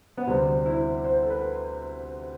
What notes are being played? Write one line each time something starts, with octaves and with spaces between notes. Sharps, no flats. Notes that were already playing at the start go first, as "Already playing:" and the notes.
B3
D2 C3 G3 C4
E4
C5
A4
B4